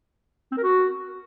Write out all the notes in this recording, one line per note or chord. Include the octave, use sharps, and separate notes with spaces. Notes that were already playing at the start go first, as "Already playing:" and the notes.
C4
A#4
F#4